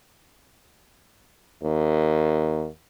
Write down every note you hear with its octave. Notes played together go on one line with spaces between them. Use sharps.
D#2